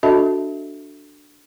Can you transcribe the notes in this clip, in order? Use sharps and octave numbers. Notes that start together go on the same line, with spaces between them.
D4 F#4 A4 D#5 E5 A5